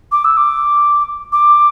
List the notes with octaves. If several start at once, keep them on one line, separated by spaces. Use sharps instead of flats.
D6
E6
D6
D6